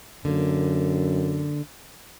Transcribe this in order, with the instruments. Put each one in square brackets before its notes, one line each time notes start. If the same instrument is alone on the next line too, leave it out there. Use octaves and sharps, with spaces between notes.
[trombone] F#2 [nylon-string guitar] D3 A#3